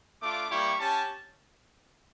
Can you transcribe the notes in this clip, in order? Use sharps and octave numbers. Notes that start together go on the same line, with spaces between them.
A3 D4 F4 D6
G3 A#3 E4 G4 C#6
C#4 G4 A5